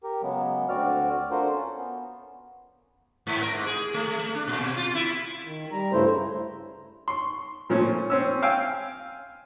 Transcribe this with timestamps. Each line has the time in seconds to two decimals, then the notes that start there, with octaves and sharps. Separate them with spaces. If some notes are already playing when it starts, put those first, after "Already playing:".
0.03 G4 A#4
0.22 C#3 F#3 G#3 B3
0.69 D2 C4 F#4 D5 F6
1.31 D4 F4 F#4 A4 A#4 C5
1.54 C#4
1.78 B3
3.27 G#2
3.42 A#4
3.54 G#2
3.66 G#4
3.94 A3
4.08 A3
4.19 A3
4.35 D4
4.48 A#2
4.61 B2
4.77 F4
4.95 E4
5.45 D#3
5.72 G3 A#5
5.93 G2 C#3 A3 E4 C5
7.08 C6 C#6
7.70 A#2 F3 A3 C#4
8.10 C4 C#4 E6
8.42 F5 G5 G#5 E6